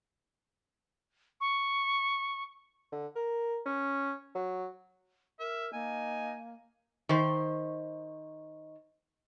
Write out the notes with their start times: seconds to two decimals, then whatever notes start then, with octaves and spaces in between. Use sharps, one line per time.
1.41 C#6
2.92 D3
3.16 A#4
3.66 C#4
4.35 F#3
5.40 A#4 E5
5.73 A#3 D#4 G#5
7.09 D#3 C5